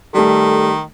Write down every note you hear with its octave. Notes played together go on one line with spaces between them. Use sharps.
D#3 G3 A3 A4